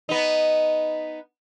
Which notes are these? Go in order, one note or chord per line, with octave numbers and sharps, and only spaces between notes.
B3 D#4